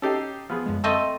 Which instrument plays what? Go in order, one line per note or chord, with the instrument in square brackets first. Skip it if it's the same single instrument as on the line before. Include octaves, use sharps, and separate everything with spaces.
[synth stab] C#4 C7 [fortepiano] D#4 G4 A4
[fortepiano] F3 B3 G#4
[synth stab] F#2 D3 G#3
[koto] A3 C4 D#5 [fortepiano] A4 E6